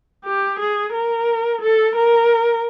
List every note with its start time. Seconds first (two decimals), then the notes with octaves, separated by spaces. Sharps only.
0.24 G4
0.59 G#4
0.93 A#4
1.62 A4
1.96 A#4